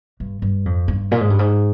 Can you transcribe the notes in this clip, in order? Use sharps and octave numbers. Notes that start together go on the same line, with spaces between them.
G2
G2
F2
G2
A#2
G#2
G2
G#2